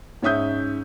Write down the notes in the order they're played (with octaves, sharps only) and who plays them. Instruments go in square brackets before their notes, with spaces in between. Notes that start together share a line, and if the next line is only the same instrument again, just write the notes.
[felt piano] G#2 C#4 E5 D#6 G6